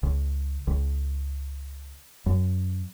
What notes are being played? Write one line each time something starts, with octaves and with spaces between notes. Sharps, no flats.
C#2
C#2
F#2